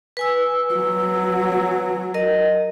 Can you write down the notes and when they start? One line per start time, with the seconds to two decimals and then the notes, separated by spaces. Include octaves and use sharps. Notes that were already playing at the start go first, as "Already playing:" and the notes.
0.17 B4 G#5 E6
0.74 F#3
2.14 A#4 D#5